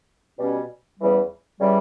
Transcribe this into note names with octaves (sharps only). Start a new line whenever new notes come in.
B2 G3 C#4
E2 C#3 E3 G3
C#3 E3 G3